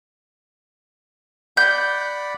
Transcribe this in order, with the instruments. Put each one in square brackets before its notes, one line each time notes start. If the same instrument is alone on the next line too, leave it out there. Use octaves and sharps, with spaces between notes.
[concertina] D5 F#5 B5 [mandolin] G6